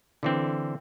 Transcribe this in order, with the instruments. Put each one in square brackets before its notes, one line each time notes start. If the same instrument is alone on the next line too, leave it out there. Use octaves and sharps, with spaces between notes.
[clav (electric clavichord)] D3 E3 C4